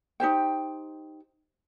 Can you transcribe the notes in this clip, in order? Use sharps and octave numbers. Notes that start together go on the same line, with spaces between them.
D#4 G4 C5 G5